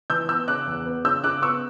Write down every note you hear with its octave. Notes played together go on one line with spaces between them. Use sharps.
E3 E6 G6
B3 E6 G6
C#3 D6 F#6
E2
B3
C#3 E6 G6
C#3 D6 F#6
B3 C#6 E6